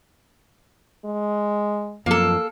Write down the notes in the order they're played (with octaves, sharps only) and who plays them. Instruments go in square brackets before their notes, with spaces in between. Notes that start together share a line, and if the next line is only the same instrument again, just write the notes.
[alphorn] G#3
[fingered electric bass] F#2 F3 [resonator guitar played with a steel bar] A#3 A4